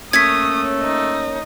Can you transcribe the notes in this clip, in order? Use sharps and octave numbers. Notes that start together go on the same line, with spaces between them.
A3 A#3 C#4 C#5 D#6 G#6 B6
D#4